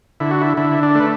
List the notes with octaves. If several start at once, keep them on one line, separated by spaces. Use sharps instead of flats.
D3 E4
F#4
E4
D3 E4
D4
A3 B4